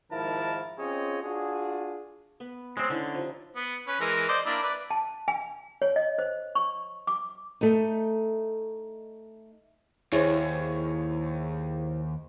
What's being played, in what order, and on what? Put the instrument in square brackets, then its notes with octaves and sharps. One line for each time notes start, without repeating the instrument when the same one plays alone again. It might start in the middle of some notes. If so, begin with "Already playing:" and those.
[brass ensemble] G#2 D#3 F3 E4 A#4 A5
C4 C#4 F4 G#4 C#5 D#5
D4 F4 F#4 G#4
[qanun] B3 B4
[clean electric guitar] G#3 C4 [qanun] C5 C#5
[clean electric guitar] D3 [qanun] C#4 D#4 E4
[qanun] F3 G3
[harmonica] B3
C#4 B4
E3 G#3 A#4
C5 D5 D#5
A#3 D4 E4
B4 D5
[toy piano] A5
G#5
C#5
D#5
C5
C#6
D6
[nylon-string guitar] A3 D#4
[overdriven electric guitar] D#2 [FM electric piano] E4 G#4 C5 [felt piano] C#5